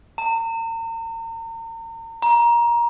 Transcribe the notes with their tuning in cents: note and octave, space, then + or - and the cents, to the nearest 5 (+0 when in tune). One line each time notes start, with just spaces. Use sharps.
A#5 -40
A#5 +20